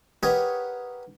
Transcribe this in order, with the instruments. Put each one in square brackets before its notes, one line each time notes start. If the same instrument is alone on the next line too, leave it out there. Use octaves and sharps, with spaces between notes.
[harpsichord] G4 A#4 B4 C#5 D#5 F#5